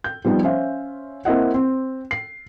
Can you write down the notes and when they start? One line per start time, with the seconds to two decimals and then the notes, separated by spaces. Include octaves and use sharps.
0.04 G6
0.25 F3 G3 B3 D#4
0.43 C#4 C5 E5 F5
1.25 A#3 C4 E4 D#5 F#5
1.54 C4
2.11 C7